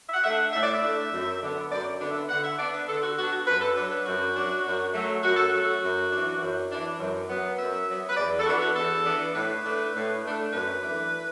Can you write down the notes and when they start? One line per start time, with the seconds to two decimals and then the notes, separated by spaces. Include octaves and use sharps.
0.09 E5
0.14 F#5
0.24 A3 D4 E5
0.33 F#5
0.53 A2 E5
0.63 D5
0.74 E5
0.83 A3 D4
1.12 F#2
1.41 D3 B3 D4
1.70 F#2 D5
2.00 D3 B3 D4
2.09 E5
2.29 D3 F#5
2.44 E5
2.58 B3 D4 D5
2.74 B4
2.88 D3 A4
3.03 F#4
3.18 B3 D4 F#4
3.33 F#4
3.47 F#2 B4
3.61 A4
3.76 F#3 D4 B4
3.91 B4
4.06 F#2 F#4
4.36 F#3 D4
4.64 F#2
4.94 F#3 A3
5.23 F#2 F#4
5.36 A4
5.48 F#3 A3 F#4
5.82 F#2
6.12 E3 D4
6.41 F#2
6.70 E3 D4
6.99 F#2
7.30 F#3 B3
7.59 F#2 E5
7.88 F#3 B3
8.09 B4
8.17 E2 D5
8.40 A4
8.46 E3 B3 D4 F#4
8.62 F#4
8.76 E2 A4
9.06 E3 B3 D4
9.34 A2 B4
9.65 A3 D4
9.94 A2
10.23 A3 D4
10.52 F#2 B4
10.82 E3 A3 D4